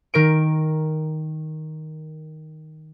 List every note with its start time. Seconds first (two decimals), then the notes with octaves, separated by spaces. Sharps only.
0.14 D#3 A#4 D7